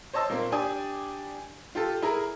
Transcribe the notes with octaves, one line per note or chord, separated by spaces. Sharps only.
C5 C#5 D#5 A5 E6
A#2 A#3 C4
D4 G4 D5 G#5 D#6
F4 G4 A4
E4 G#4 A#4